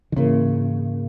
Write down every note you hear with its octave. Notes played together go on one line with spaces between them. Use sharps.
D#3
G#2 C#3 E3 A#3 E4 A#4